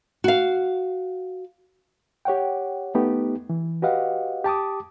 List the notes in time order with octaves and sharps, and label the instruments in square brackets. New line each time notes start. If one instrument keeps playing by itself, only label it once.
[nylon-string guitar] F#4 F5
[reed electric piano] G4 C#5 F#5 G5
A3 B3 D#4 G4
E3
F#4 G4 B4 D#5 F5 F#5
G4 A5 D6 D#6